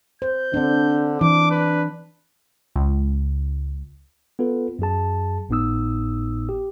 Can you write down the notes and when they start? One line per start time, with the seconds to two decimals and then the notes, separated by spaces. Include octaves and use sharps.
0.22 C5 G6
0.54 D3 C4 D4
1.21 E3 D4 D6
1.51 B4
2.76 C#2
4.39 B3 F4 A4 B4
4.79 F#2 F#3 G#4 A5
5.49 G#1 A2 B3 D#4 D#6 E6
6.49 G4